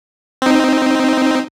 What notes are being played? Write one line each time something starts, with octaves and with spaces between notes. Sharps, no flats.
C4 D#4